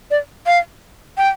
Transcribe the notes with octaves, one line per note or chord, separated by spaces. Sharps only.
D5
F5
G5